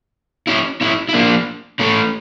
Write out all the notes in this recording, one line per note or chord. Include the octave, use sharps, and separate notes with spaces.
C#4 E4
C#4 E4
E4
A#3 D4
A3 C#4